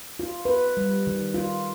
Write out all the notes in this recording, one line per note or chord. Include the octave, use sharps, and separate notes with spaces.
F4
B4
G3
D#3
F4